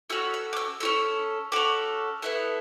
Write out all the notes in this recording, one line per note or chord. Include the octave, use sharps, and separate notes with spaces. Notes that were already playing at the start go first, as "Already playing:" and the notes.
C#4 F#4 A4 E6
E6
D6
E6
C#4 F#4 A4 E6
C#4 F#4 A4 D6
B3 E4 A4 F#6